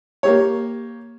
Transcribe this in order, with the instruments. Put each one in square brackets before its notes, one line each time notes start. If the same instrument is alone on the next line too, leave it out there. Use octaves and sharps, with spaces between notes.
[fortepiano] A#3 G4 C#5